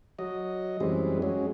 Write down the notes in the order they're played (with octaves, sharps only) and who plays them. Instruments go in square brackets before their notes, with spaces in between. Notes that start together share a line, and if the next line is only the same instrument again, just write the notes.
[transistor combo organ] F#3 D#5
F#2 E3 G3 G#3 C4
F#3 G#3 C#4